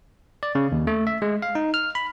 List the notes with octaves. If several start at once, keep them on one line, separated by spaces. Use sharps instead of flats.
D5
C#3
D#2
A3
E5
G#3
F5
D#4
F6
B5